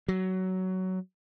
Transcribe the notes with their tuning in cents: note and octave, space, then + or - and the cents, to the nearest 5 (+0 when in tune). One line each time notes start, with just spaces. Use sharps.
F#3 +15